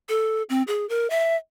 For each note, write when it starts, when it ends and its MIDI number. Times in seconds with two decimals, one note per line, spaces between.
0.09 0.42 69
0.49 0.63 60
0.67 0.88 68
0.89 1.09 70
1.10 1.36 76